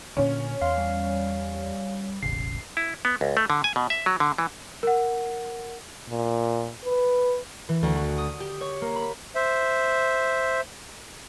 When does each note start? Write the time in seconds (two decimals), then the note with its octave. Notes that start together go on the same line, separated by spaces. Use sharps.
0.17 A#2 D3 C#4
0.62 E2 F5 C6
0.78 G3
2.23 E1 A1 C#3 C7
2.77 E4
3.05 B3
3.21 C#2
3.37 A3
3.50 D3
3.64 G#5
3.76 B2
3.90 E5
4.06 F#3
4.20 D3
4.38 E3
4.83 A#4 F#5
6.09 A#2
6.85 B4
7.69 E3
7.83 D2
7.96 F#4
8.18 D#6
8.40 G4
8.61 C#5
8.82 A#3
8.96 B5
9.35 C5 E5